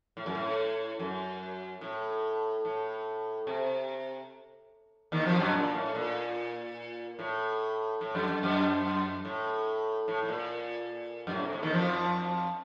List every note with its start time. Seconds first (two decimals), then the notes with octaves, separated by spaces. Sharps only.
0.17 A2
0.26 F#2
0.35 A2
0.99 F#2
1.81 A2
2.65 A2
3.47 C3
5.12 D#2 D#3
5.26 F2 F3
5.40 F#2 F#3
5.53 A#2
5.74 A2
5.95 A#2
7.19 A2
8.01 A2
8.15 F#2
8.29 F#2
8.43 F#2
9.25 A2
10.08 A2
10.23 A2
10.28 A#2
11.27 F#2
11.32 A2
11.42 C3
11.53 A2
11.63 D#2 D#3
11.73 F2 F3